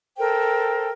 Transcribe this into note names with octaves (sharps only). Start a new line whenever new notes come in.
A4 A#4 C5 G5